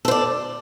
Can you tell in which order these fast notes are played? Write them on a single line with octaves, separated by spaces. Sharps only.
A4 C5 D5